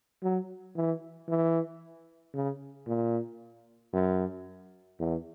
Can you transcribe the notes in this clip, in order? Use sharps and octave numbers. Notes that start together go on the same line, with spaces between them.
F#3
E3
E3
C#3
A#2
F#2
E2